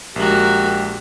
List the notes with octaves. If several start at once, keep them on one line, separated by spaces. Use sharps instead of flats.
A#1 G#3 F#4 G4 A#4